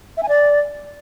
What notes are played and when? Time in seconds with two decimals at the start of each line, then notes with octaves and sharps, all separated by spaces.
0.17 E5
0.23 G#5
0.29 D5